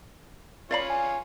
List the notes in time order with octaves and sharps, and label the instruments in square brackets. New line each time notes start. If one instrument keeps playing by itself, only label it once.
[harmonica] C#4 F4 C#5 [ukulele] D5 F5 B5
[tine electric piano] G#5